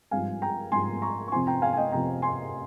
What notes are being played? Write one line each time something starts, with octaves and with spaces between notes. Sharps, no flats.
G#1 G2 F3 F5 G#5
G5 A#5
G#1 G2 F3 G#5 C6
A#5 C#6
C#6
F2 C3 F3 C4 G#5 C6
G5 A#5
F5 G#5
G#5
D#5 G5
F2 C3 F3 C4 G5 A#5
G#5 C6